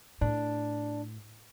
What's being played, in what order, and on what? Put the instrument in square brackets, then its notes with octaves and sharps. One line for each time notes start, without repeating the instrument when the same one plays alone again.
[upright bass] A2 [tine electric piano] D4